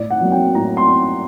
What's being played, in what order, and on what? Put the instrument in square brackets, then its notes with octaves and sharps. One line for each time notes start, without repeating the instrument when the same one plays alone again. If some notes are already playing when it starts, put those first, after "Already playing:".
Already playing: [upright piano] A2 D5
F#5
F#3 A#3
G5
A2 A#5
C6